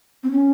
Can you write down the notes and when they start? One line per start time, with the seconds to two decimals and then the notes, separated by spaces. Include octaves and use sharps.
0.23 C4
0.31 C#4